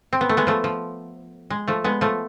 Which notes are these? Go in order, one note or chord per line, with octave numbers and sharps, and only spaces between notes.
C4
B3
A3
G#3 B3
F3 A3
F3
G#3
F3 A3
G#3 B3
F3 A3